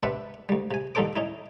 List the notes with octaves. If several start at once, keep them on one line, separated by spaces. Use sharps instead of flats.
C4 D4 G4 B4 E5 F#5
D2 G3
C3 G#5
D#2 G3 D#4 A4 C5 D6
C#4 D#4 E4